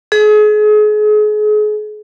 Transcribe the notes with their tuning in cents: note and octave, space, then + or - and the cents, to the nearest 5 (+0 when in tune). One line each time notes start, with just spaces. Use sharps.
G#4 +35